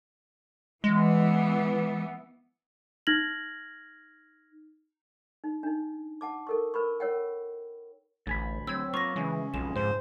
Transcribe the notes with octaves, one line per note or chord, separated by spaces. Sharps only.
E3 G#3 B3
D#4 F6 G#6 A#6 F#7
D#4
D4 D#4
F#5 A5 D6
A4 A#4 C#6
A#4 B4 B5 C#6
A#4 C#5 F#5 G5
A1 D2 G#5 B5
F#3 C4 E6 G#6
A#3 B3 F4 C#6 A#6
C#3 E3 G#3 C#4
B1 F2 C#3 G#3 E7
G#2 C5